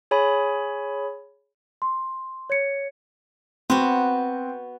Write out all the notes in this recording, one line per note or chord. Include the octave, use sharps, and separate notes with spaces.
G#4 C#5 G#5 B5
C6
C#5 G#6 C#7
B3 C4 F#4